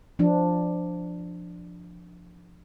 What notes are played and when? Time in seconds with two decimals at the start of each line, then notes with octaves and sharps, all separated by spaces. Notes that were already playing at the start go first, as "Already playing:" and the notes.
0.19 F3 D4